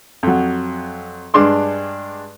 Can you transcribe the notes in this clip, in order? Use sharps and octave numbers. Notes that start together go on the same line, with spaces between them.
F2 F#3
G2 G#3 D4 C6 D6